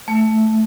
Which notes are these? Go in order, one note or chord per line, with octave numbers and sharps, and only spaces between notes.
A3